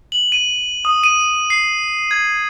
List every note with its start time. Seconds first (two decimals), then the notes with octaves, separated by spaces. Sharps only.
0.12 F#7
0.32 D#7
0.85 D#6
1.04 D#7
1.50 C7
2.11 G#6